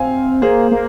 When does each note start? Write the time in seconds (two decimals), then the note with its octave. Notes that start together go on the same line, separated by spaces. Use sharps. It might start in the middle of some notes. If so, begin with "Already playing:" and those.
Already playing: C4 F5 G#5
0.42 A#3 G#4 C5
0.71 A#3